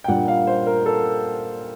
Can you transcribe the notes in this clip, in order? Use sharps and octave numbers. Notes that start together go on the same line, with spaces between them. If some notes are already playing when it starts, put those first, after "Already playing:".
G5
A#2 G3 A#3 D4 F#5
F5
C5
A#4
A4